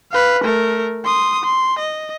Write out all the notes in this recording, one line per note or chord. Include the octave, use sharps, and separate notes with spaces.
B4 F5
A3 A#4
C6 D#6
C6
D#5